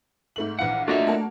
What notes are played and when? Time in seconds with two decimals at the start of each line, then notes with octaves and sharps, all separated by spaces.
0.36 G#2 A3 F#7
0.59 A#1 E3 F5 F#5
0.88 A3 A#3 D4 F4 F#4 D#5 E5 F7
1.07 A#3 F#5 A5